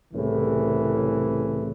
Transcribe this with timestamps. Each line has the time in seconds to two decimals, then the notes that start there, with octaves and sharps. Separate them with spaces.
0.14 C2 A2 C#3 E3